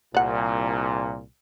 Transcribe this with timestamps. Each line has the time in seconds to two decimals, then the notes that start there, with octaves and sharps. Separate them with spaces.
0.14 C2 A#2 D5 F#5